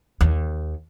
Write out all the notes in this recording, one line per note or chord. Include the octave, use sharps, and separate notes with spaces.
D#2